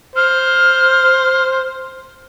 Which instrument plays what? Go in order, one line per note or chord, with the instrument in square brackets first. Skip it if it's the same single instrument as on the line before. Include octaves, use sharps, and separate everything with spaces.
[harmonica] C5 [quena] F6